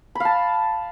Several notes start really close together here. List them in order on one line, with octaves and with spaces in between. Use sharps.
B5 F5 A5